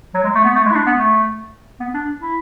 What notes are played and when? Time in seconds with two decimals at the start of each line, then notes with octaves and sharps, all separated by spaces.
0.14 F#3
0.24 G#3
0.35 A3
0.45 B3
0.56 A3
0.66 G#3
0.71 E4
0.75 D4
0.87 B3
0.97 A3
1.80 B3
1.94 D4
2.21 E4